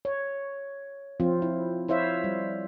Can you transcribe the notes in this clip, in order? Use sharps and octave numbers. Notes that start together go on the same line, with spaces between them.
C#5
F3 C4 F4
E4
E4 C5 C#5 E5 F5
G3